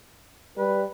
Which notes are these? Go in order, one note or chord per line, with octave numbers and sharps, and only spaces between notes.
G3 B4